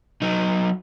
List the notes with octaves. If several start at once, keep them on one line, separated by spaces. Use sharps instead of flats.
F#3 D#4